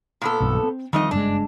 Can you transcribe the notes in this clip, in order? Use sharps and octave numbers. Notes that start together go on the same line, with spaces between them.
A#2 B3 A4
B1 G2 E3
C4
F2 D#3 G3 D#4 D#5
F#1 G2 G#3 D4